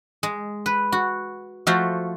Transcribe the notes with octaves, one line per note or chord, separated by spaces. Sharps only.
G#3
B4
F#4
F3 A3 F4 F#4 C5 E5